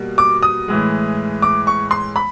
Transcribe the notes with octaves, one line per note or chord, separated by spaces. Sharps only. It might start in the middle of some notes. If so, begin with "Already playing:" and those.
Already playing: B2 G3 A#3
D6
D#6
A2 E3 G#3
D6
C#6
C6
B5